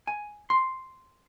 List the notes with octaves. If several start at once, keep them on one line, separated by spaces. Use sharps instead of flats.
G#5
C6